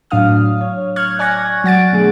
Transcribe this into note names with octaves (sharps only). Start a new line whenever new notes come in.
A2 F#3 D4 F5 D#6 F6
C#5
C#6 F6 F#6 G#6
D5 G#5 C#6 F#6 G#6 A#6
F#3 F#5 A6 D7
B2 D3 A3 G#4